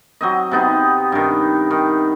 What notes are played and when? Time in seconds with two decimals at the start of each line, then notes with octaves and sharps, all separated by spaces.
0.21 F#3 C4 D#5
0.52 C3 B3 D#4
1.12 G2 D#3
1.71 D#3